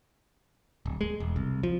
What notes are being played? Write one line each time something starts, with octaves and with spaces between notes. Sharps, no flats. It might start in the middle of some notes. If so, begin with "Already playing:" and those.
D1
G#3
E1
C2
F3